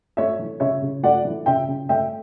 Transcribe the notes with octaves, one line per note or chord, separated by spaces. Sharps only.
A3 C#5 E5
E3
C#3 C#5 E5
C#3
A3 D5 F#5
E3
C#3 E5 G5
C#3
A3 E5 G5